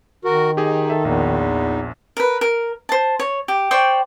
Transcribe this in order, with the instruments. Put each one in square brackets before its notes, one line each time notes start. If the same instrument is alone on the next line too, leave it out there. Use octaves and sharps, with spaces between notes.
[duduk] D#3 [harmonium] F#4 A#4
[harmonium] D#4 [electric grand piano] G4 G#4 D#5
[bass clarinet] A4 [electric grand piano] E5
[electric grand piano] A#1 A#2 [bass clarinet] E2
[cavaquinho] A#4 B4
A#4
C5 A5
C#5
G4
C5 D5 G5 C#6